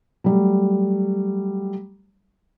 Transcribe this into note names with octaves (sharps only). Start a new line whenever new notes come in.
F#3 G3 A3